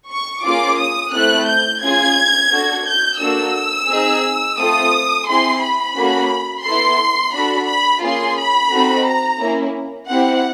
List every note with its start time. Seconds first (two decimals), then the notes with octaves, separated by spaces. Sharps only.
0.10 C#6
0.44 A#3 C#4 F4 G#4 D6
0.78 D#6
1.13 A3 C4 E4 A4 F#6
1.47 G6
1.82 C#4 F4 G#4 G#6
2.52 D4 F#4 A4
2.86 G6
3.20 A#3 D4 F#4 A4 E6
3.89 C4 D#4 G#4
4.57 A3 C4 F4 A4 D#6
5.26 C4 E4 G#4 C6
5.62 B5
5.97 A#3 C#4 F#4 A4
6.64 B3 E4 A4 C6
7.33 D4 F#4 A4 B5
7.68 B5
8.03 A#3 C#4 F4 G#4 C6
8.37 B5
8.71 C4 D#4 F#4 A4
9.06 A#5
9.40 A#3 C#4 E4
10.09 C4 E4 G4 F#5